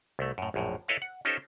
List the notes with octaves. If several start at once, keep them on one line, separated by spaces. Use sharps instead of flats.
C2 A3
F#2 A2
A#1 F#2 A2
E4 A4 B4 C#5 D#5 F5
F#5
C#4 D#4 F4 G4 A4 C5